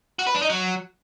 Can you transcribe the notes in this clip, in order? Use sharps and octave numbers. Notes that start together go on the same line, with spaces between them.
F#4
B4
D4
D#4
F#3